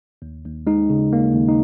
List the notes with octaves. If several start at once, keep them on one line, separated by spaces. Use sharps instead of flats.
D#2
D#2
G#3 D#4
C#3
D#2 A#3
D#2
D#4